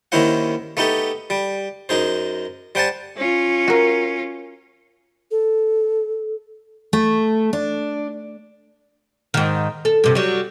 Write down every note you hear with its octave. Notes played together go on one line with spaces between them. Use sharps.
D#2 D#3 C#4 E4 C5 F#5
A3 B3 D#4 G4 A4
G3
F#2 D#4 G#4 C5
G3 C5 F#5 G#5 A5
C#4 F4
F#4 A#4
A4
A3
D4
G#2 D#3
A4
G2 C3
F#3 G3